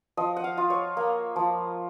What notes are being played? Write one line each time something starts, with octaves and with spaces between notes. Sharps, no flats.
F3 D#5
F#5
F5
F4
C#5
A#3
F3